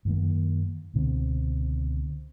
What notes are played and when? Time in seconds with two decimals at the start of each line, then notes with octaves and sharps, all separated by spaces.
0.05 F#2 D#3 A#3
0.94 C#2 B2 D3 C4